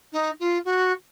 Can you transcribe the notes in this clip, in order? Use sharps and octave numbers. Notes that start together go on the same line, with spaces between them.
D#4
F4
F#4